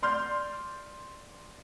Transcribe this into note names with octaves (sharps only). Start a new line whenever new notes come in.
D5 C6 F6 G6